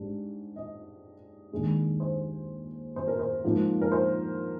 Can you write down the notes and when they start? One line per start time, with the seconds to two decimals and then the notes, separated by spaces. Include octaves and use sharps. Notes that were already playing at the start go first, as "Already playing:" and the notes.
Already playing: G#2 G3 D4
0.56 D#5
1.52 D#2 D#3 G#3 D4
2.00 C5
2.96 C5
3.08 A#4
3.19 C5
3.44 G#2 F3 A#3 D#4
3.81 A#4
3.92 C5